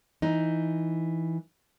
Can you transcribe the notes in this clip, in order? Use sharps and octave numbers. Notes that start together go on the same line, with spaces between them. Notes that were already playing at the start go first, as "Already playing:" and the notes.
E3 D#4